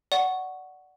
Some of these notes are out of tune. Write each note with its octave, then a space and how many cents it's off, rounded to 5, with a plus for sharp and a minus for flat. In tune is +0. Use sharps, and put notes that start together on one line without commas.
D5 +0 F#5 +5 C#6 +0